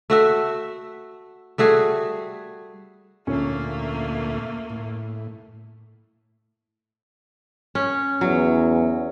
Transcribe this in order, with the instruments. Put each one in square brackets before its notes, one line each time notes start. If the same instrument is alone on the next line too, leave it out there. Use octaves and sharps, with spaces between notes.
[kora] A3 F#4 E5
G3 A3 F#4 G#4
[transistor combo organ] D2 A#2 [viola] A3 A#3 [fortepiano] C#4
[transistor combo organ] A2
[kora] C#4
[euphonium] E2 [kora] F#3